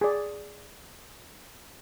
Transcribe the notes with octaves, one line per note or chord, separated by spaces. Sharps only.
G#4 D5